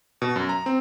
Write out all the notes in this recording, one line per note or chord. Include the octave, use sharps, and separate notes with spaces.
B2
F#2
A#5
C4